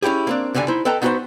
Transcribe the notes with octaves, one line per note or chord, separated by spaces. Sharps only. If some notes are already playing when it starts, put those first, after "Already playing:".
C#4 D#4 E4 G4 G#4
A#3 C4 D4
F#2 D3 G3 D4 G#5
D#4 E4 C5
A4 B4 D#5 G5 A5 A#5
B3 D#4 F#4 G#4 B4 C5